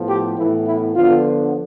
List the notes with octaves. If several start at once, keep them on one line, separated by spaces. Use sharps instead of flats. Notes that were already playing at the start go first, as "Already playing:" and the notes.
Already playing: A2 F3 B3
G4
A2 E3 B3 E4
E4
D3 F3 B3 F4